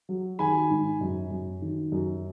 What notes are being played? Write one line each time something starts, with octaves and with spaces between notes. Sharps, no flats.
F#3
D#3 G#5 B5
G#2
F#2
F#2
D#3
F#2